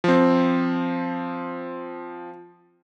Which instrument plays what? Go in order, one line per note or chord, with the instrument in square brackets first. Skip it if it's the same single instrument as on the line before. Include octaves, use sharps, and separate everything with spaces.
[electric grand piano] F3 C4